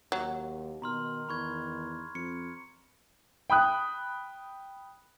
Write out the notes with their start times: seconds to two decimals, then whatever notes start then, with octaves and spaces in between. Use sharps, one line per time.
0.12 D#2 F#3
0.82 B2 D#3 A#5 C6 F6
1.29 E2 B5 C#6 G#6
2.15 F2 C#7
3.50 G5 B5 D#6 F#6